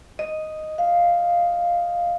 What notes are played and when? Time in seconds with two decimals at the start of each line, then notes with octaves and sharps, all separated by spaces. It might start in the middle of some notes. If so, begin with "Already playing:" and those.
0.19 D#5
0.78 F5